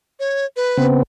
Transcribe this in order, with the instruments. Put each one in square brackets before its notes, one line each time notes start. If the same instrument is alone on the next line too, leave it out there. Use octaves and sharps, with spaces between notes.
[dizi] C#5
B4
[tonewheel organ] C#3 B3 C4